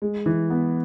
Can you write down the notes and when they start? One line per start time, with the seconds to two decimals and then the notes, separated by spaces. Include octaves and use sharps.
0.02 G#3
0.26 E3
0.50 B3